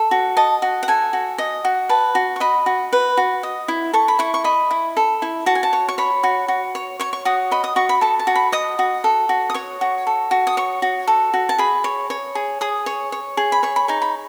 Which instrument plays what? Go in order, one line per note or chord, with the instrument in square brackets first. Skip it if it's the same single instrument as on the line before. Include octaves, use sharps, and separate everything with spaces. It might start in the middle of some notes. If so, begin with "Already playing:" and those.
Already playing: [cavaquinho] A4
F#4
D#5 A5
F#4
F#5
A4 G#5
F#4
D#5
F#4
B4 A5
F#4
C#6
D#5 B5
F#4
B4
F#4
D#5
E4
A4 C#6
B5
E4 C#6
C#6
D#5 B5
E4
A4
E4
F#4 A5
G#5
A5
C#5
C#6
C#5 B5
F#4
F#4
C#5
C#5 C#6
C#6
F#4 D#6
D#5 B5
D#6
F#4 C#6
B5
A4 A5
A5
F#4
B5
D#5 D#6
F#4
A4
F#4
D#6
C#5 C#6
F#4
A4
F#4
D#6
C#5 C#6
F#4
A4
F#4
A5
G#4 B5
C#5
C#5
G#4
G#4 D#6
C#5
C#5
G#4
B5
C#5 C#6
B5
D#4 G#5
B5